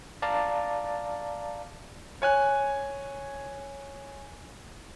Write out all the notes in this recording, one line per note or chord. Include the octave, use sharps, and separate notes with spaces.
D5 F5 A5 A#5
C#5 G#5 F#6